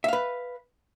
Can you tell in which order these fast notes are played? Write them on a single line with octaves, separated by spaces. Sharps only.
E5 F5 B4